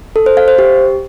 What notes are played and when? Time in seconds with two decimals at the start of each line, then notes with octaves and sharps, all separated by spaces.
0.16 A4
0.26 C5
0.37 F5
0.48 C5
0.58 G4